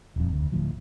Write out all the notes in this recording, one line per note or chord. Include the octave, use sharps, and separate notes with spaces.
D#1 F2
D2
D1 D2 F3